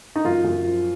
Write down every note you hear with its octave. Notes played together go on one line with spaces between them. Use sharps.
D#4
F#2 F4
F#2
F3